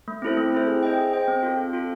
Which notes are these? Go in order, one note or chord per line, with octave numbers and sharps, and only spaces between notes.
A3
C4 E4 A4 C5
A3
C4 E4 A4 C5
G#4
C5 D#5 G5
G#4
C5 D#5 G5
C4
F4 A4
C4
F4 A4